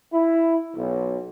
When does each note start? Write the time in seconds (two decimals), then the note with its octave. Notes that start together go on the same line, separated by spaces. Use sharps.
0.13 E4
0.76 B1